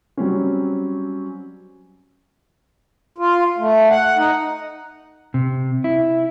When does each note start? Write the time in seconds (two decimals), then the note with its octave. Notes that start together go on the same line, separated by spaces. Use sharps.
0.17 F#3 G3 C4 C#4
3.18 F4
3.58 A3
3.90 F#5
4.17 D#4
5.34 C3
5.84 E4